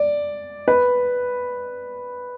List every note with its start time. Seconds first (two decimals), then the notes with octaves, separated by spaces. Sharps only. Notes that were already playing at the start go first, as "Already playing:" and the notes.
Already playing: D5
0.68 B4